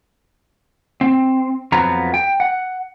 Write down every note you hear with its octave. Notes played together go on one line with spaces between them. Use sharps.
C4
F2 F3 F#3 B3 A#5
G5
F#5